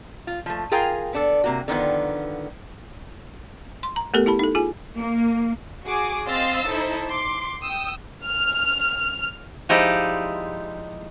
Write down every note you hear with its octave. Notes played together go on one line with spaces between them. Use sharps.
F4
F3 A3
F4 G#4 A#4 F5 G5 G#5
B3 D4 A4
C3 A#3 F#4
D3 D#3 F3 B3
C6
A#5
A3 B3 G4 A4 A#4
E4 G4 A5 B5
D#4 A4
F4 G#4 G#5
A#3
F#4 G#4 D6
C4 D#5 F5 C6 E6 A6
D#4 E4 A4 C5
C6 D6
G5 D#6 E6
F6
F3 G#3 D#4 E4 G4 D5